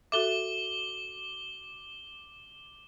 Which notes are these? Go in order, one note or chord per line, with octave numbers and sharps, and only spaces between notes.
F#4 A4 E5 D6 G7